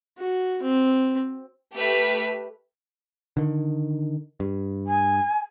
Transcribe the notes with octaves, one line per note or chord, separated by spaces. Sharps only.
F#4
C4
A3 G4 B4 E5 F6 B6
D3 D#3
G2
G#5